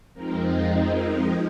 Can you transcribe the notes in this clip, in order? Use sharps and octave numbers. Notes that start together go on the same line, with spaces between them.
F2 F3 G#3 C4 D#4 A#4
C5
A#4